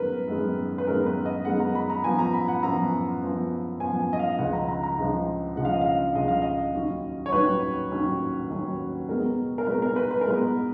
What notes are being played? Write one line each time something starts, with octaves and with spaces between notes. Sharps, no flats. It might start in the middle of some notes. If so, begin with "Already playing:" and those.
Already playing: F#2 D#3 G#3 B3 A#4 B4
F#2 D#3 G#3 B3
B4
F#2 D#3 G#3 B3 A#4
B4
D#5
F#2 D#3 G#3 B3 F#5
A#5
B5
A#5
F#2 F3 B3 G#5
A#5
B5
F#5
F#2 F3 B3 A#5
F#2 F3 B3
F#2 F3 B3 G#5
G#5
D#5
F5
C#2 C#3 F3 F#5
A#5
A#5
A#5
C#2 C#3 F3
C#2 C#3 F3 F#5
F5
D#5
F5
C#2 C#3 F3 D#5
F5
D#5
D#2 D#3 F#3 C#4
C#5
D#2 D#3 F#3 C#4 B4
D#2 D#3 F#3 C#4
D#2 D#3 F#3 C#4
B2 G#3 B3 A#4
A#4
B2 G#3 B3 B4
A#4
B4
B4
A#4
B2 G#3 B3 B4